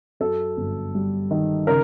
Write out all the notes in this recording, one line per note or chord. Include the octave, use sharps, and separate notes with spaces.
F#2 A4
G1
G3
D#3
C#3 A#4